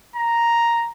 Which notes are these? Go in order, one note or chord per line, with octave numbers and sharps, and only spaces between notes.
A#5